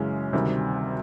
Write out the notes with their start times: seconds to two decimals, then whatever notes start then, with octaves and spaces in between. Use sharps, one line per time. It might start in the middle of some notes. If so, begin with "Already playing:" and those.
Already playing: F#2 C#3 E3 G#3 C#4
0.33 D2 C3 D#3 G3